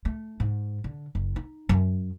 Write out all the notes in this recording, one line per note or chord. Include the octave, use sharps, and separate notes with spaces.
A3
G#2
D3
F#1
D#4
F#2